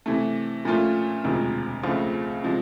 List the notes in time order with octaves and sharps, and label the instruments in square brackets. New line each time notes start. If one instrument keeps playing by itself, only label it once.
[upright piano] C3 E3 A3
A#2 F3 A3 C#4 F4
E1 D2 C3 F3 G#3
C#2 C#3 F3 A3 C4
C3 F3 G#3